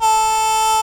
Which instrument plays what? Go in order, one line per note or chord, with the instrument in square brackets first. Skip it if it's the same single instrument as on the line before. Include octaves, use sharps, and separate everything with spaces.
[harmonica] A4